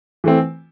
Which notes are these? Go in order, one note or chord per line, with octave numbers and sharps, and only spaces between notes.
E3 A3 C4